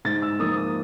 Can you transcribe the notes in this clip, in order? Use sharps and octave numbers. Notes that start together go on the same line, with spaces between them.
G#2 A6
E6
F3 A#3 D#6
D#6